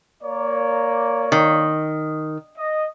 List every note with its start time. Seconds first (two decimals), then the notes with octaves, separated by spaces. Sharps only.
0.23 A#3 C#5 D5
1.32 D#3
2.58 D#5